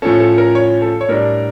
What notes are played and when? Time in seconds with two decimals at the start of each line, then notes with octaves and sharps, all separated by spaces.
0.02 A2 F3 C#4 A4
0.20 A4
0.38 A#4
0.55 C#5
0.82 A4
1.01 C#5
1.09 A2 G3 D4 A#4